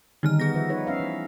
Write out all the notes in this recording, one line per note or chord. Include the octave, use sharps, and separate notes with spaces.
D3 D#3 G3 D#4 F6
B3 G#4 A#6
F3 B4 E5
D#4 B4 C#5
C#4 E5 F5
E3